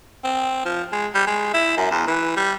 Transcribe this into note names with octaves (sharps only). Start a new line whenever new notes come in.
C4
F3
G#3
G3
G#3
E4
F#2
E2
E3
G3